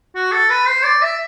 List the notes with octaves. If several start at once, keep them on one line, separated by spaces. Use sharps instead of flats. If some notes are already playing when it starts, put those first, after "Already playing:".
F#4
A4
B4
C5
D5
E5